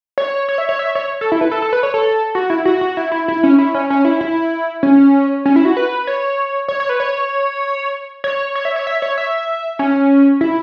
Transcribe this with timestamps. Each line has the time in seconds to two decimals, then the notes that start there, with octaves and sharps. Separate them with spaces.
0.18 C#5
0.49 C#5
0.58 E5
0.69 C#5
0.79 E5
0.95 C#5
1.21 A4
1.32 E4
1.41 B4
1.51 A4
1.62 A4
1.73 B4
1.83 C#5
1.94 A4
2.35 F#4
2.50 E4
2.65 F#4
2.81 F#4
2.97 E4
3.12 E4
3.28 E4
3.43 C#4
3.58 E4
3.74 C#4
3.90 C#4
4.05 E4
4.21 E4
4.83 C#4
5.46 C#4
5.56 E4
5.65 F#4
5.77 B4
6.07 C#5
6.68 C#5
6.80 C#5
6.89 B4
7.00 C#5
8.24 C#5
8.55 C#5
8.65 E5
8.76 C#5
8.87 E5
9.02 C#5
9.18 E5
9.79 C#4
10.41 E4